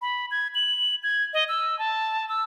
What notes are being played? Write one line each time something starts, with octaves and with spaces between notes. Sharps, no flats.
B5
G#6
F#7
G#6
D#5
E6
A5
E6